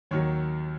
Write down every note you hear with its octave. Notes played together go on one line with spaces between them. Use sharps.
D#2 D#3 F#3 C#5